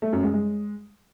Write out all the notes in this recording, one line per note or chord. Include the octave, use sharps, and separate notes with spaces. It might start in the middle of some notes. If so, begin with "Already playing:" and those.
A3
F#2
G#3
G#3